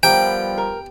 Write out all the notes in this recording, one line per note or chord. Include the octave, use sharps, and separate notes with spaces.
F3 G3 B3 G4 A#4 G5
A#4